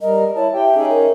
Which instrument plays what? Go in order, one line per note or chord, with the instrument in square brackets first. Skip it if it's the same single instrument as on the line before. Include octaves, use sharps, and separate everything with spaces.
[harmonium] G3 A#4 [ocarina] D#5
[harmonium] E4 A5 [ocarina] C#5
[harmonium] G4 G5 [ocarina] E5
[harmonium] C#4 D#4 G#4
[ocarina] A#4